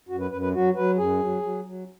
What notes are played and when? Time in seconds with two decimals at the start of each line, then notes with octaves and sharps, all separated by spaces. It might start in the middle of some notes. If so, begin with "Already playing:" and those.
0.08 F#2 F#4
0.20 B4
0.31 F#2 B4
0.41 B4
0.54 F#3 F#4
0.75 F#3 B4
0.98 F#2 G#4
1.20 F#3
1.42 F#3
1.65 F#3